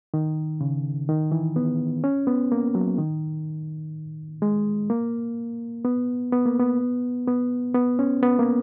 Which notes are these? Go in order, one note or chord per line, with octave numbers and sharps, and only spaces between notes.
D#3
C#3
D#3
E3
B3
C#4
B3
A#3
F#3
D#3
G#3
A#3
B3
B3
A#3
B3
B3
B3
C#4
B3
A#3